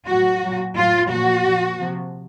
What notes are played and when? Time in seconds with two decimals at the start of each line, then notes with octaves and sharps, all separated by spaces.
0.08 A2 F#3 F#4
0.43 A#2 F#3
0.76 A2 F#3 F4
1.11 A#2 F3 F#4
1.45 A#2 F3
1.79 C3 F3